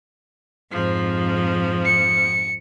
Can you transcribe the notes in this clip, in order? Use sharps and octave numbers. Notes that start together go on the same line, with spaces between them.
F2 G#2 F3
C#7